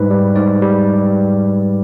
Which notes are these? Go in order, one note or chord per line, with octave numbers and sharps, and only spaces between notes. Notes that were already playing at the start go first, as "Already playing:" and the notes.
Already playing: G#2 G3 B4
G3
G#2 D5
G3